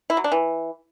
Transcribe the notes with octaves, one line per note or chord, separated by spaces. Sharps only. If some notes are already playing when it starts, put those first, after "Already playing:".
E4
F#3
D4
E3